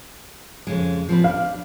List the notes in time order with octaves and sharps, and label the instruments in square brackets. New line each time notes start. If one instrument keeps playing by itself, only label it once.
[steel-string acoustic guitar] F2 C#3 G#3
F3 C4 B4
[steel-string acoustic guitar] D4 [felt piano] F5